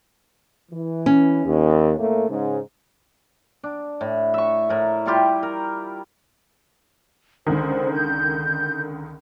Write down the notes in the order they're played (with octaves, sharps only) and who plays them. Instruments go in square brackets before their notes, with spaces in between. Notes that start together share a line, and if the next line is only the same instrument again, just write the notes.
[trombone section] E3
[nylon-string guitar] C#4
[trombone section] D#2
A2 A3 A#3
G#2 C#3
[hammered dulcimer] D4
A2
E5 C#6
A2 A#4
G3 E4 F4 G4
A#4
[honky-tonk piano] C#2 D3 D#3 [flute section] C5
[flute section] G6